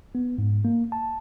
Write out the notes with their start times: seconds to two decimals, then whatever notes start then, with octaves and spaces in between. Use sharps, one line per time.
0.15 B3
0.38 G#2
0.65 A#3
0.92 A5